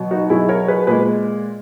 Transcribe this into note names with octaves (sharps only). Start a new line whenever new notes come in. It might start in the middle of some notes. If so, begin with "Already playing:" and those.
Already playing: B2 F#3
D#4 F#4
B2 F#3 E4 G#4
A#4 C#5
A#4
G#4 B4
A#2 G#3 G#4 B4